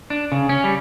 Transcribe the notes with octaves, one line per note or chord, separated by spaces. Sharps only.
D4
C#3
C#4
G3